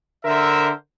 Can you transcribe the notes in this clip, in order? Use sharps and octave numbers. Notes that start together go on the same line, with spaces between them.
D3 A#4 C5 E5